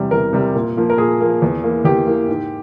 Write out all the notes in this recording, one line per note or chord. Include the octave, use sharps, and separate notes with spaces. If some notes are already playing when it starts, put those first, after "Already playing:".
Already playing: E2 C3 G3
E2 A#4
C3 G3
A#2
F3 A#3
A#4
A#2 G#4
F3 A#3
E2
E3 A#3
E2 G4
E3 A#3
G#2